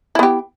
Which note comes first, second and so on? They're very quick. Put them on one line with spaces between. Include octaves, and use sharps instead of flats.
E4 B3 G4